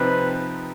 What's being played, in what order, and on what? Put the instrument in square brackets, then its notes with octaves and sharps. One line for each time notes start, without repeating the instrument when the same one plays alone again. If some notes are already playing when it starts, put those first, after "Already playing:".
Already playing: [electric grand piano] C3 F3 C4 D#4 [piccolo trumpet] B4